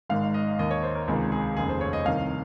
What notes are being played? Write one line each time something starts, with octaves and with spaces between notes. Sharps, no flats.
G#1 G#2 D#3 F5
D#5
D#2 D#3 D#5
C#5
C5
A#4
C#2 C3 D#3 G#4
G#4
F1 D#2 C#3 G#4
C5
C#5
D#5
C2 C3 D#3 F5